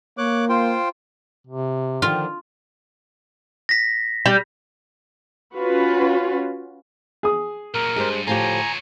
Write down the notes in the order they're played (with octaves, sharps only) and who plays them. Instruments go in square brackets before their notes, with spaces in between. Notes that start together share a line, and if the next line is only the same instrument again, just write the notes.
[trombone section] A#3 [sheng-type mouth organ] C#5 D6 F#6
[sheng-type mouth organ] F4 C5 G5
[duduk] C3
[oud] D3 D#3 F3 [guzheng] F4
[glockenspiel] A#6 B6
[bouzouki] G3
[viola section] C#4 F4 F#4 B4
[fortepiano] G#4 D#6
[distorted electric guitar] A#2 F#3 [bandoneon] A#4
[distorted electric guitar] G2 [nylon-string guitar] G#3 G4 C5
[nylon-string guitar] A2 F3 G4 [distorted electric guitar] F4 C#5 [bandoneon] G#5 A#5